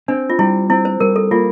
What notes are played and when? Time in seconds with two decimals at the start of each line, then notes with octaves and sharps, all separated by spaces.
0.08 C4 D4
0.30 F4
0.39 G3 E4
0.70 C4 E4
0.85 C5
1.00 G3 A#4
1.16 A4
1.31 A#3 F4